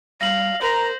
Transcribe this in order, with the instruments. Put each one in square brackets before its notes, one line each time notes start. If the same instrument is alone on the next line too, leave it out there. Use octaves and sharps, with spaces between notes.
[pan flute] G3 [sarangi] F5 [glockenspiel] A#6 F#7
[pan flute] A#4 [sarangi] C5 [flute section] A#5